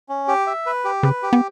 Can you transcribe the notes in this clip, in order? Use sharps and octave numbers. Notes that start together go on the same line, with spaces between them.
C#4
G4
E5
B4
G4
C#3 B4
G4
B3